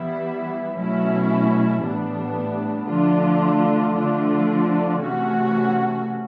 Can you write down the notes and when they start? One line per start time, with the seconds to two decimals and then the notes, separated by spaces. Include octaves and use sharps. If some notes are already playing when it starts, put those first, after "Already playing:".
Already playing: E3 G3 B3 E4
0.76 B2 F#3 A3 C#4 E4
1.82 A2 E3 G3 B3 D4
2.88 D3 F3 A3 D4 F4
3.95 D3 F3 A3 D4 F4
5.00 C3 E3 A3 C#4 F#4